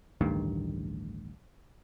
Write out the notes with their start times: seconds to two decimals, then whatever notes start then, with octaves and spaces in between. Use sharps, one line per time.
0.21 A1 D2 G2 D#3